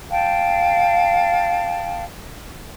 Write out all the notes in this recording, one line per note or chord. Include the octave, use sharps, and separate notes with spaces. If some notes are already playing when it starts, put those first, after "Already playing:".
F5 G5 A5